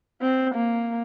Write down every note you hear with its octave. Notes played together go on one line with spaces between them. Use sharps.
C4
A#3